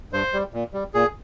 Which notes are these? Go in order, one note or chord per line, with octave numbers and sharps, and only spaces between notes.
G2 C5
G3
A#2
G3
A#2 G#4